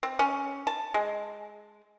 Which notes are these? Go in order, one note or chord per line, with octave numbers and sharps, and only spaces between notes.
C4
C#4
A5
G#3